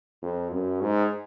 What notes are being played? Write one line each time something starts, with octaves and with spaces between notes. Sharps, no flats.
F2
F#2
G#2